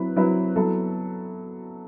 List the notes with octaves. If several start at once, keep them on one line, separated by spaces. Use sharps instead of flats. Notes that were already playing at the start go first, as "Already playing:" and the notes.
Already playing: F#3 C4 E4 B4
F#3 C4 E4 B4
F#3 B3 E4 A4